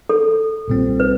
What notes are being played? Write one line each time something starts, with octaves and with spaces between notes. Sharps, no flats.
A4
B1 A#2 G3 C4
B4